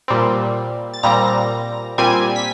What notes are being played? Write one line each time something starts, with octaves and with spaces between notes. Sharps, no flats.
A#2 G3 C4
A6
A#2 G3 C4 A#5 A#6
A#2 G3 C4 G#5 G#6
B6